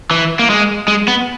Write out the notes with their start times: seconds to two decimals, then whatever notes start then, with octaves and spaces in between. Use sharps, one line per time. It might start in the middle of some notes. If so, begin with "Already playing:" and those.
0.11 E3
0.39 A#3
0.50 G#3
0.88 G#3
1.08 B3